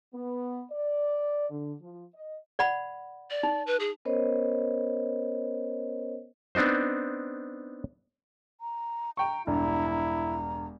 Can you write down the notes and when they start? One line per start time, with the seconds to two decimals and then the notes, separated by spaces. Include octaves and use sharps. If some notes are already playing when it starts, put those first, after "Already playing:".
0.14 B3
0.72 D5
1.50 D3
1.81 F3
2.15 D#5
2.59 D5 F#5 B5
3.30 D5
3.43 D#4
3.67 B4
3.80 G#4
4.05 B3 C#4 A#4 C5 C#5 D#5
6.55 B3 C4 D4 D#4 C5
8.61 A#5
9.17 G5 A#5 C#6
9.47 E1 G2 E4 A#5
9.91 A#5